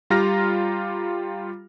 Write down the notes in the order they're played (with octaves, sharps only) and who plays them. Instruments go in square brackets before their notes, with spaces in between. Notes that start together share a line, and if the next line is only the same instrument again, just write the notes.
[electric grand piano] G3 F4 G4 A#5 F6 A#6